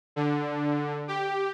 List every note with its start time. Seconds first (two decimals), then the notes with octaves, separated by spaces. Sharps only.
0.16 D3
1.08 G4